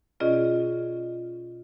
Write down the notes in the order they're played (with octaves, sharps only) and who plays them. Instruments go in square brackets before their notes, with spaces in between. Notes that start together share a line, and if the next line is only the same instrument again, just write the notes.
[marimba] B2 C#4 F4 G#4 D5 D#5